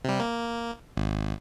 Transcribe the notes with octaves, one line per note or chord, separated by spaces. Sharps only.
C3 G3
A#3
G#1